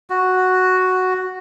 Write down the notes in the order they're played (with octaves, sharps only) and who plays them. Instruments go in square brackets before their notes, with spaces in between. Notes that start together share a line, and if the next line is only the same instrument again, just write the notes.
[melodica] F#4